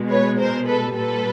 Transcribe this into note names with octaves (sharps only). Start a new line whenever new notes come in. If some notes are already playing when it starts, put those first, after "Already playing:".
Already playing: B2 G#3
B4 C#5
A#4 C5
A4 B4
A#2 G3 A4 B4